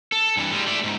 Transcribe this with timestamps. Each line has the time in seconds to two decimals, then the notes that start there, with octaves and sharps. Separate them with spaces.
0.12 A4
0.37 G2 E3
0.52 G3 G#3
0.67 A3 D5
0.84 C#2 G#2